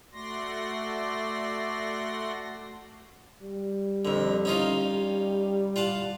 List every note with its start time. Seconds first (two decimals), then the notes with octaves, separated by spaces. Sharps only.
0.12 A3 F#4 D5 C6 A#6
3.42 G3
4.05 F2 D3
4.45 C#4 D#4 F4
5.76 F4 F#5 A5